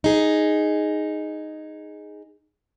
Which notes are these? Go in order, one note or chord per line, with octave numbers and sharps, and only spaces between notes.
D#4 G#4